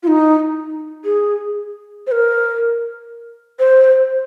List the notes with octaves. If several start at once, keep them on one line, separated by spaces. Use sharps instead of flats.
F4
D#4
G#4
C5
A#4
C5